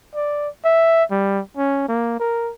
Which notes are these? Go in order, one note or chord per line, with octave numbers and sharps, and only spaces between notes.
D5
E5
G3
C#4
A#3
A#4